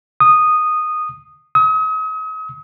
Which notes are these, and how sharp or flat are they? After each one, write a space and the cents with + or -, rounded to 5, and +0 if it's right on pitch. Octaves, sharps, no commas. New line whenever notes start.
D#6 -10
D#6 +40